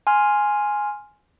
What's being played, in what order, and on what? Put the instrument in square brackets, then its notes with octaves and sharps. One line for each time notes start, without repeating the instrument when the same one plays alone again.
[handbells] G#5 C6 F6